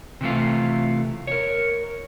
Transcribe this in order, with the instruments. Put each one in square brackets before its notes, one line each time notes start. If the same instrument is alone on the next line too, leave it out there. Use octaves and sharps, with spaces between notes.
[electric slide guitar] C3 E3 A3 F4
A#4 C#5